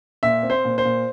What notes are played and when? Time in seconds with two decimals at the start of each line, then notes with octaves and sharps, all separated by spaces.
0.23 A#2 E5
0.43 C4
0.50 C5
0.65 A#2
0.78 C5
0.85 A#2